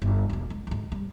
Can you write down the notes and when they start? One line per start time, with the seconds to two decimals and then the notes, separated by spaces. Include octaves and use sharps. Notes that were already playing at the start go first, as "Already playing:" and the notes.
0.02 G1
0.29 E1 B3
0.50 G#3
0.67 D2 G#2
0.92 G3